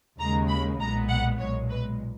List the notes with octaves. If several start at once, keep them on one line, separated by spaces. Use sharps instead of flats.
D#2 C#3 G#3 A#5
B5
B1 A#2 G#3 B3 A#5
F#5
B1 A#2 G#3 C#5
B4